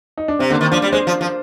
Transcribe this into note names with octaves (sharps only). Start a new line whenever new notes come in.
D#4
D4
C3 C4
D3 A#3
D#3
F3 D4
G3
G#3 C5
F3
F3